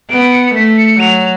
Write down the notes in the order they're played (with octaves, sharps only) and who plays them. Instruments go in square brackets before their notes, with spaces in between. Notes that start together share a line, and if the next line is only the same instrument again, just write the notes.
[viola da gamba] B3 [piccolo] D7
[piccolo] C#7
C#7
[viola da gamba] A3 [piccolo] B6
[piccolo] C#7
[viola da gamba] F#3 [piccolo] F7